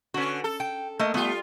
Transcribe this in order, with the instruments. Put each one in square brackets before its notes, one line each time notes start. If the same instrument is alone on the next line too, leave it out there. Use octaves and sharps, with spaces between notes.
[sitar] D3 C#4 [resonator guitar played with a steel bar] F#4 B4
[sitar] A4
[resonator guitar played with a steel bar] G5
A3 A#3 D#5
[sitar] G3 F4 [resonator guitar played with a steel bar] A3 B3